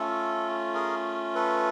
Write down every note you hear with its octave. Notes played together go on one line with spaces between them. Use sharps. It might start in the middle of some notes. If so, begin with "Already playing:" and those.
Already playing: A3 C#4 F4 A4
G#4 A#4
A4 B4